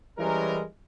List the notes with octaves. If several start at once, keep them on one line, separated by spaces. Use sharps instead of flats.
E3 G3 G#3 C#4 E4 A#4